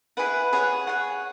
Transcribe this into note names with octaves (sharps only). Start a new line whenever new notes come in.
E4 G#4 B4 F#5
G#4 C#5 F#5
G#4 C#5 F#5